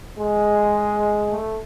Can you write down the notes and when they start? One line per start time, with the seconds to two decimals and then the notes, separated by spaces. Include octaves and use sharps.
0.18 G#3
1.30 A3